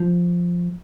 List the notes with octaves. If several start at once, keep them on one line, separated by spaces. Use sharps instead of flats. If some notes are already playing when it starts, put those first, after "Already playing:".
Already playing: F3